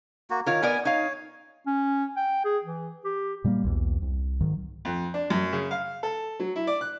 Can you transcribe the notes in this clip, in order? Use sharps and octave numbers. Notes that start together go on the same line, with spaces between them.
A#3 F#4
D#3 F4 A#4 C#5
B3 A#4 D5 G#5
D#4 C#5 F5
C#4
G5
G#4
E3
G4
A#2 G3 A3 A#3
B1 E2
C2
G#2 D#3 F#3
F2
D4
F#2
C#3
F5
A4
F#3
E4
D5
F#6